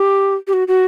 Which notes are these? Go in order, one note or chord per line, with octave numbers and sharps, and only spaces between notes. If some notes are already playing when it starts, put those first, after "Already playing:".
Already playing: G4
G4
F#4
F#4